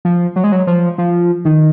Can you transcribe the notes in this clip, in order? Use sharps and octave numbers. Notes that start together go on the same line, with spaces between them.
F3
F#3
G#3
F#3
F3
F3
D#3